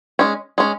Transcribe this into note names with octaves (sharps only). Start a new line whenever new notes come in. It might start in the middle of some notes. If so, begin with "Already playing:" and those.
G#3 C#4
G#3 C#4